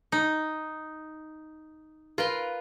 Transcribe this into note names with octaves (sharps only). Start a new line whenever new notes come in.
D#4
F4 A#4 B4 C6